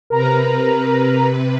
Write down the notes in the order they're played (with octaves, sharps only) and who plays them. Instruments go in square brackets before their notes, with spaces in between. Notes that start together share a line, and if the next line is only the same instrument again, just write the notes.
[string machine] C3 B4 [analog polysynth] A#4 A#5